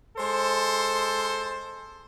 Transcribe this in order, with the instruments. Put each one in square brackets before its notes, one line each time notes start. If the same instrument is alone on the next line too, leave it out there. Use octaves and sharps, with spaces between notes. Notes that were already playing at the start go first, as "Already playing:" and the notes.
[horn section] G#3 A4 C5